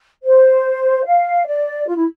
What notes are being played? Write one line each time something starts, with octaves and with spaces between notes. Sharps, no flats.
C5
F5
D5
F4
E4